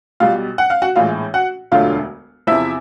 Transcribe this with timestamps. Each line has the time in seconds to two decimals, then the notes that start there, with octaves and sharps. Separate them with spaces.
0.20 B1 B2 G3 F4 F5
0.58 F#5
0.70 F5
0.82 F#4 F#5
0.96 A#1 A2 E3 G#3 F4 F5
1.34 F#4 F#5
1.72 E1 D2 D3 F#3 A3 F4 F5
2.47 E2 C3 F3 E4 E5